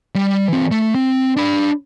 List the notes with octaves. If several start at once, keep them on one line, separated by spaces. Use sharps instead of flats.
G3
E3 C4
A3
C4
D4 B5